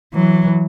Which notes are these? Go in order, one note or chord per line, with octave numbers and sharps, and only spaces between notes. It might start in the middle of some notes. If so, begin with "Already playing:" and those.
E3 F#3